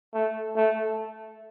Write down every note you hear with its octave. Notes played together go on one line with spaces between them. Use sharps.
A3
A3